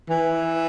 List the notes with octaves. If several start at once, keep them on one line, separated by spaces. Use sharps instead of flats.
E3